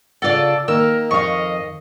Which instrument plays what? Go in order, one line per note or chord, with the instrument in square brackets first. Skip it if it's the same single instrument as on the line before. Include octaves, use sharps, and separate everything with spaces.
[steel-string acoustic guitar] C#3 F4 F#5 [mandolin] A4 D5
[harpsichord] D#3 [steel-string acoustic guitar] A#3 [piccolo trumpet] A#4 [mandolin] E6
[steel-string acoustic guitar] F2 F5 [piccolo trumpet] D#5 [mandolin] C#6